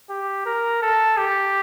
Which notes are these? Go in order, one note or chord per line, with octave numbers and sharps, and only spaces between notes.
G4
A#4
A4
G4